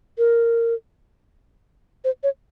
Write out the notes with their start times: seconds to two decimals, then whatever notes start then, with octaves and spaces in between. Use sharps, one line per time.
0.18 A#4
2.04 C5
2.23 C#5